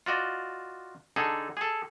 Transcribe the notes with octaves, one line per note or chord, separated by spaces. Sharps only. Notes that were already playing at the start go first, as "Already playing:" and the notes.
F4 F#4 D5 D#5
D3 D#4 G#4 A4
G#4 A4